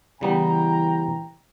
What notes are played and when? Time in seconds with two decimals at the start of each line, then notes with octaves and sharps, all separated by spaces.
0.21 C#3 E3 G3 B3 G5 A#5